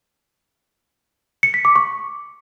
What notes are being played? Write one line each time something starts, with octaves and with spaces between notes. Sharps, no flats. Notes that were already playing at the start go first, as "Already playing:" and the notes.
C#7
B6
D6
C#6